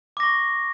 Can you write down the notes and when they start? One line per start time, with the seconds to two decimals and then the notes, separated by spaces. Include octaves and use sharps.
0.17 D6
0.20 A#6
0.23 C#6